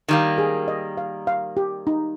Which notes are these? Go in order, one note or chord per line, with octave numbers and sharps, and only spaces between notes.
D#3 G3 A#3
G#4
D#5
F5
F5
G4
D#4